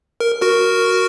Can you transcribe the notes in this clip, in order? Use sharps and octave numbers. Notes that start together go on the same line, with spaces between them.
A#4
F#4 A#4